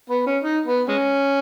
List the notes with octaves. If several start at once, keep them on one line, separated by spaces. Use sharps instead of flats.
B3
C#4
D#4
B3
G#3 C#4